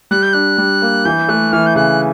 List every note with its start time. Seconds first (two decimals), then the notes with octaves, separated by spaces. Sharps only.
0.11 G3 F#6
0.22 G6
0.33 D4 F#6
0.58 G3
0.82 A#3
1.05 E3 G6
1.29 A3 F#6
1.52 E3 F6
1.66 G6
1.76 C#3 F#6